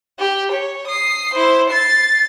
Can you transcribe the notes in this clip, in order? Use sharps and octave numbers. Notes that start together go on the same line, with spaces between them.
G4
C#5
D#6 C7
E4 C5
A6 C7